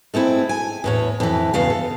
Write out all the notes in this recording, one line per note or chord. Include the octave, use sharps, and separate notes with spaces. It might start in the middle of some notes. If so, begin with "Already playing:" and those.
G#3 A3 C4 E4
G#5
E2 A2 C#5
F2 E3
E2 G2 C#3 F5
A4